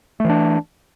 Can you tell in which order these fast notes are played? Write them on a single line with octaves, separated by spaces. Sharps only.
A3 E3 D4